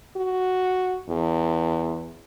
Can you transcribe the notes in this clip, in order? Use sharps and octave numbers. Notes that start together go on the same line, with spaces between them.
F#4
E2